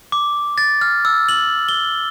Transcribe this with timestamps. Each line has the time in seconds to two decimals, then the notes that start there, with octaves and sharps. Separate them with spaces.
0.12 D6
0.58 A6
0.81 F6
1.05 E6
1.29 F#7
1.69 G7